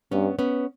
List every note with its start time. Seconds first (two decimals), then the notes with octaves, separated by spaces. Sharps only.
0.12 G2 B3 C#4
0.39 B3 C#4